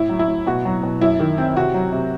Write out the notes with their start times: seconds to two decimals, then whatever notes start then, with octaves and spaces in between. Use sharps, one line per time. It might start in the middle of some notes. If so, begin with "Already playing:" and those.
Already playing: A2 E4
0.09 F#3
0.19 E4
0.28 A2
0.47 B2 F#4
0.65 F#3
0.83 B2
1.01 F#2 E4
1.19 D#3
1.38 C4
1.56 C3 F#4
1.74 F#3
1.92 C3